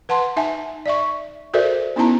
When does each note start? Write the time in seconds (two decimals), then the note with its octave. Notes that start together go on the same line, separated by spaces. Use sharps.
0.09 B4 F#5 A5 C6
0.36 D#4 E5 G#5 A5
0.86 D5 E5 C#6
1.54 F#4 A4 A#4 C5 D5 E5
1.96 B3 C#4 D#4 E4 A5 A#5